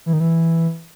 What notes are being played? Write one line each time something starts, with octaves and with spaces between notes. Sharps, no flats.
E3
D#3
E3